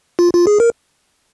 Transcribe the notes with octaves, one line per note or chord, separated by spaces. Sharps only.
F4
F4
G#4
A#4